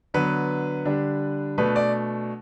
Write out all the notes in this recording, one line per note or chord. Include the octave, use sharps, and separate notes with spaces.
D3 F#3 B3 B4
D3 G3 D4
B2 A3 D4 B4
D5